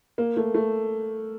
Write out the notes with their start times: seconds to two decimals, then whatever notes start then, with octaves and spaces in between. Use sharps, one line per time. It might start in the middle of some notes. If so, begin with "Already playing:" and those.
0.18 A#3
0.37 A3
0.55 A3